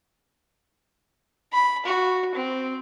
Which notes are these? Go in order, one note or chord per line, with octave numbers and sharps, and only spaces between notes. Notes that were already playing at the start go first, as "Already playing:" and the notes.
B5
F#4
C4